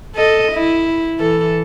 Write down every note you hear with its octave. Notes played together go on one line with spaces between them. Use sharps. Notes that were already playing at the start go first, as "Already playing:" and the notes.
A4 D#5
E4
E3 A4